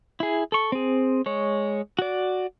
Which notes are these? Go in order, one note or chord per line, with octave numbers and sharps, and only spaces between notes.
E4 G#4
A4 C#6
C4 G#4
G#3 C#5
F#4 D5